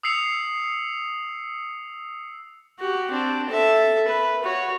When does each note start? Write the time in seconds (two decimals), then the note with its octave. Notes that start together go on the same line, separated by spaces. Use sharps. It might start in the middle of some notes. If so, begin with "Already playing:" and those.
0.03 D#6 E6 C7 C#7 F7
2.80 F#4 G4
3.11 C4 D4
3.49 A4 E5
4.07 B4
4.43 F#4 C#5